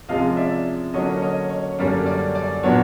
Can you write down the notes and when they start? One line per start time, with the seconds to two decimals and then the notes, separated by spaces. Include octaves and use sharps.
0.09 C3 F3 G#3 C#4 D#5 F5
0.37 D5 E5
0.94 D3 F#3 A#3 C#4 C#5 D#5
1.21 C#5 D#5
1.50 C#5
1.79 F#2 D3 G3 A#3 C#4 D5
2.06 D5
2.35 D5
2.63 A#2 F#3 B3 D4 C#5